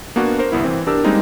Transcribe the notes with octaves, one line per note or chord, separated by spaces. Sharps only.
A#3 B3 D4 F#4
A#4 C5
G1 C2 B3 E4
E3 C4
D4 G4 A#4 E6
G3 G#3 A#3 C4 D#4